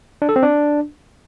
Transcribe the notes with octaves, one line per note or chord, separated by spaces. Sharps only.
D4
A4
C4
D4